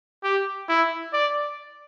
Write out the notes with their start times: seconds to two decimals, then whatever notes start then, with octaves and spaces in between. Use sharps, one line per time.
0.24 G4
0.69 E4
1.13 D5